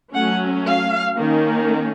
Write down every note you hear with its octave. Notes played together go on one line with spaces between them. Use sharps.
F#3 A3 C#4 F#5
F5
D#3 A#3 C#4